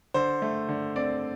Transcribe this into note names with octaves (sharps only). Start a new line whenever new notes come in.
D3 C5
A3
D3
C4 D5